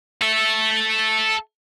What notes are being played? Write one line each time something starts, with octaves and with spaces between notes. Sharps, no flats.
A4 E5